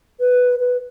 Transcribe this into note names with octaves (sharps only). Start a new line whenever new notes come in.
B4
B4